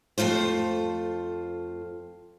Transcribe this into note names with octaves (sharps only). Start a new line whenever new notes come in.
F2 B2 A3 F4 C5